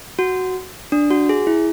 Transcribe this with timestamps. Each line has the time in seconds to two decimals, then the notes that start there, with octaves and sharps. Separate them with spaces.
0.19 F#4
0.92 D4
1.10 F#4
1.29 G#4
1.47 E4